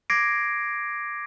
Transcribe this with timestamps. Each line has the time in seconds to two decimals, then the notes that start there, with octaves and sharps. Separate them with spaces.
0.10 D6 G#6 A#6 C7 D7